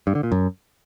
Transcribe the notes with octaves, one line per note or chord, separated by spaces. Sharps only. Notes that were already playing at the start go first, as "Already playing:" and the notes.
G2
D3
A#2
F#2